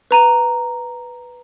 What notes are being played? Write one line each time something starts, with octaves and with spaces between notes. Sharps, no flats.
B4 A#5 D#7